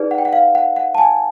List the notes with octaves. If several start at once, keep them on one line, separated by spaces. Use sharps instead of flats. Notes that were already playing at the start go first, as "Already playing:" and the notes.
Already playing: D#4 G#4 B4 D5
F#5
G5
F#5
F5
F#5
F#5
A5
G#5